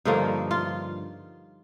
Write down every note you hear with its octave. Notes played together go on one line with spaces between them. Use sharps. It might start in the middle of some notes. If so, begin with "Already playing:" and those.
G2 D3 F3 A#3 D#4
F4